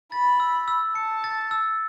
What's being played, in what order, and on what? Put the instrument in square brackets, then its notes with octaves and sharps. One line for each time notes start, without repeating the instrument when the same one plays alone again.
[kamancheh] B5 [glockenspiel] A6
[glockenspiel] E6
E6
[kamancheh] A5 [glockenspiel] C#7
[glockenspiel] A6
E6